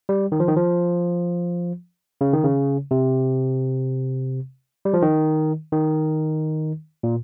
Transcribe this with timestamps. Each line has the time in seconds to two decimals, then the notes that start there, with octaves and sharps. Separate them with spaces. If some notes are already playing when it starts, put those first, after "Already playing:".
0.09 G3
0.32 D#3
0.40 F3
0.48 D#3
0.56 F3
2.21 C#3
2.33 D#3
2.44 C#3
2.91 C3
4.85 G3
4.94 F3
5.02 D#3
5.73 D#3
7.03 A#2